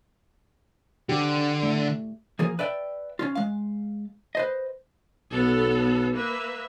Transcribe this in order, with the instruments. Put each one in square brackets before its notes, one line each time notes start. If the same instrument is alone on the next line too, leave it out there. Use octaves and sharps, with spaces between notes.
[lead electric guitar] D3 [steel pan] G4
[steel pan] A3
[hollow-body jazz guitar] F3 A#3 G#4 A#4
B4 D5 E5 G5
C#4 D#4 F4
G#3 F5
B4 C5 D#5
[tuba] B1 [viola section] B3 A4
[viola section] A#3 B4 E5